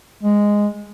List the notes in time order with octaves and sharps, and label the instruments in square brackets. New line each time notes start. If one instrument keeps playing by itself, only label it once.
[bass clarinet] G#3